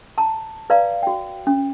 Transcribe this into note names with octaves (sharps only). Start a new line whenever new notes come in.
A5 A#5
B4 D5 F5 A#5
F#4 G5
C#4